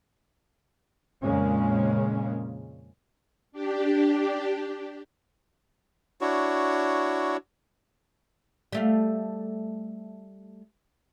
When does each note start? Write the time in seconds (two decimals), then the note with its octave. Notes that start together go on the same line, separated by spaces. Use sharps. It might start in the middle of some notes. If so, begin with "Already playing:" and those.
1.23 F2 A#2 C#3 G#3 A#3 C#4
3.52 D4 G4
6.21 D4 E4 F#4 C#5
8.72 G3 A3 F5